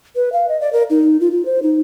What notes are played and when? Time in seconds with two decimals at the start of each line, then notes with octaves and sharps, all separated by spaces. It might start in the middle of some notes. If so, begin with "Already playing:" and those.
0.16 B4
0.33 F5
0.49 D#5
0.61 D5
0.73 A#4
0.90 D#4
1.20 F4
1.32 F4
1.45 C5
1.63 D#4